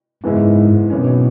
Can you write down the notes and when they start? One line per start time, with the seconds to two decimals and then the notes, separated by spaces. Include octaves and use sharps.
0.23 F#1 E2 G#2 E3 G#3 E4
0.90 G#1 F#2 B2 E3 C#4